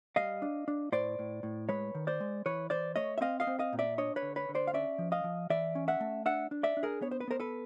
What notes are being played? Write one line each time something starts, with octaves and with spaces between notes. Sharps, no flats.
G3 D#5 F5
D4
D4
A2 C5 D5
A2
A2
G#3 B4 C#5
D#3
C5 D5
G#3
E3 B4 C#5
E3 C5 D5
A3 C#5 D#5
E5
C4 D#5 F5
D#5 F5
C4
D#5 F5
A#2
D5 E5
D4 C#5 D#5
B4 C#5
D3
B4 C#5
D3
C5 D5
F5
C#4 D5 E5
F3
D#5 F5
F3
E3 D5 E5
C#4
E5 F#5
A3
D4 E5 F#5
D4
D5 E5
D4
G#4 A#4
B3 C#5
C5
B4
B3 A#4 C5
A4 B4